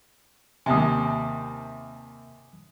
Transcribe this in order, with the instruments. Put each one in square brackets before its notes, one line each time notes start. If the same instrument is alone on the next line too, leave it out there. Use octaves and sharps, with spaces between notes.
[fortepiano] D#2 C3 [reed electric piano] G#5 A5 D#6